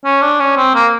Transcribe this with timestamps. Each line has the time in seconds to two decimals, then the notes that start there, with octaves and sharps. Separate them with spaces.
0.05 C#4
0.22 D4
0.40 C#4
0.57 C4
0.75 A#3